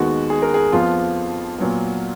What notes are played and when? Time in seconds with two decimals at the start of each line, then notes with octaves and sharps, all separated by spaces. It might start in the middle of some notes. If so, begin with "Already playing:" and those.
Already playing: D#2 D#3 G#3 B3 F#4
0.30 G#4
0.42 A#4
0.54 G#4
0.73 F2 F3 B3 F4
1.58 A#2 F#3 B3